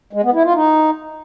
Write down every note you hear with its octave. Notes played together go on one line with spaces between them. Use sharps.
G#3
B3
E4
F4
D#4